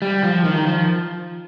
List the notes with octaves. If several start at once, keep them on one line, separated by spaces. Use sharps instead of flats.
G3
F3
D#3
F3